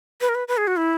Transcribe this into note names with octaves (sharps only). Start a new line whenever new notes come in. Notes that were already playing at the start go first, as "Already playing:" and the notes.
B4
A#4
B4
B4
G#4
F#4
E4